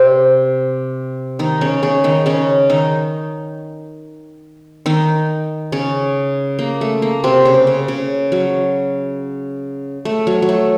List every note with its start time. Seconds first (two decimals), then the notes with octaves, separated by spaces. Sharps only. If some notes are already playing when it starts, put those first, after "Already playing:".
Already playing: C3 C4
1.39 D#3 D#4
1.61 C#3 C#4
1.83 C#3 C#4
2.04 D#3 D#4
2.26 C#3 C#4
2.70 D#3 D#4
4.86 D#3 D#4
5.72 C#3 C#4
6.59 A#3
6.81 A3
7.02 A#3
7.24 C3 C4
7.45 C#3
7.67 C#3
7.88 C#3
8.32 F#3
10.05 A3
10.27 F#3
10.42 F#3
10.49 A3